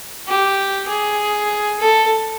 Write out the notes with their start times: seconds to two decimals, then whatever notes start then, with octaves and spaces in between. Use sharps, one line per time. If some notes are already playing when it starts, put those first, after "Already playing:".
0.28 G4
0.88 G#4
1.80 A4